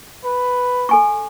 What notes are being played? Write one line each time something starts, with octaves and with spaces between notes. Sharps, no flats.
B4
A4 G#5 C#6